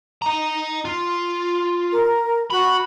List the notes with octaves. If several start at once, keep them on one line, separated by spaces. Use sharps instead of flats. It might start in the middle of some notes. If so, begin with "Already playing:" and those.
D#5 A#5
F4
A#4
F#4 B5